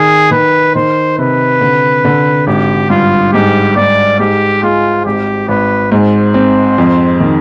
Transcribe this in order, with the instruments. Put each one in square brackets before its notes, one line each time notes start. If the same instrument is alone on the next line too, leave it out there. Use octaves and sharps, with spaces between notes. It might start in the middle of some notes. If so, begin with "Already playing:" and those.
Already playing: [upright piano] D#3 [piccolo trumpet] G#4
[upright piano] D#3 [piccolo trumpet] B4
[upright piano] D#3 [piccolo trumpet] C5
[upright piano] C3 [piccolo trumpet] B4
[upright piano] D3
D3
[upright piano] G#1 [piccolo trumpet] G4
[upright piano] G2 [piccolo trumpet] F4
[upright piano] G#2 [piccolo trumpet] G4
[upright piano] G#2 [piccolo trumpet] D5
[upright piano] G#2 [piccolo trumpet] G4
[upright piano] G#3 [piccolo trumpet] F4
[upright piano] G#1 [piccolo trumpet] G4
[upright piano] G#1 [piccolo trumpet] B4
[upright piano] G#2 [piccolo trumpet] C5
[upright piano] C4
F2
D#3